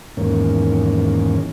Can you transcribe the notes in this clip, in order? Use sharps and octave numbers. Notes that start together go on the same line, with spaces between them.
E2 G#2 D#3 A#3 C#4